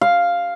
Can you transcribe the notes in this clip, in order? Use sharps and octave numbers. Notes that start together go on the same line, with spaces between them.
F5